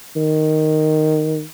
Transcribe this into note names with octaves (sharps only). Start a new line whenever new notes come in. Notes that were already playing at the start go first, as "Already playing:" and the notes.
D#3